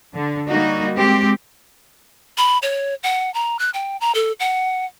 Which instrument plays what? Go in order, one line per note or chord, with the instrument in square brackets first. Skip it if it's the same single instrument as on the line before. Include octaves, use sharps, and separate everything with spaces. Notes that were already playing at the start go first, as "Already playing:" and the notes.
[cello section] D3
G3 A#3 D#4 F#4
G#3 C4 G4
[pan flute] B5
C#5
F#5
A#5
F#6
G5
A#5
A4
F#5